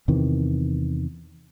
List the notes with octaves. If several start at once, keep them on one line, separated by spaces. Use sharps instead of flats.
E2 C3 D#3 E3